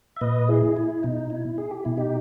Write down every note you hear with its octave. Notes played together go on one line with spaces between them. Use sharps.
E5
A#2 B4 D#5
E4 G#4
E4
B2 D#4
E4
G#4
G4
B2 E4
D#4 G4